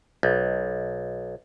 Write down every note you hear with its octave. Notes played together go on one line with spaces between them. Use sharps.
B1